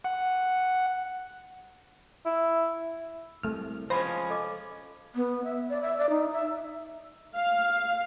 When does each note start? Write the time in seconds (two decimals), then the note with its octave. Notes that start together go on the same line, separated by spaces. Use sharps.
0.04 F#5
2.25 E4
3.43 C2 A3 F6
3.90 F3 G#3 C#4 C5 B5 A#6 C7
4.30 A4 D#5 D6
5.15 B3
5.44 E5
5.69 D5
5.82 E5
5.98 D5
6.10 D#4
6.33 E5
7.38 F5